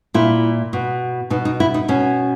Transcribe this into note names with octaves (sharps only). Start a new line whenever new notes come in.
A#2 E4
B2
B2 D#4
D#4
E4
D#4
B2 C#4